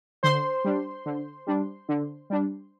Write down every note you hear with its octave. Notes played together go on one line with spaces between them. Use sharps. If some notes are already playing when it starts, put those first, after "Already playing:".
D3 C5 C6
G3 D4
D3
G3 D4
D3
G3 D4